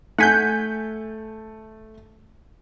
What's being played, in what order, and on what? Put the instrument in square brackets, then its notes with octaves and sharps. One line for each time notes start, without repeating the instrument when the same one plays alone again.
[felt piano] A3 B6 [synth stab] F#5 G#5 G6